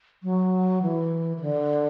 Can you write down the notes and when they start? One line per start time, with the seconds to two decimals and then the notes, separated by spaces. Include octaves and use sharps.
0.23 F#3
0.82 E3
1.37 E3
1.41 D3